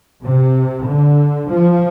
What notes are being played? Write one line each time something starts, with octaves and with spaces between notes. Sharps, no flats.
C3
D3
F3